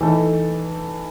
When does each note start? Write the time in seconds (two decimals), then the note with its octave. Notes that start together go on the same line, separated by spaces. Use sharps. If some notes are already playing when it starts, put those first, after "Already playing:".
0.01 E3 A3 D#4 A4